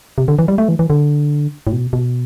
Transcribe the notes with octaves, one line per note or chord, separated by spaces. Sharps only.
C3
D3
E3
G3
A3
E3
E3
D3
A2
B2
B2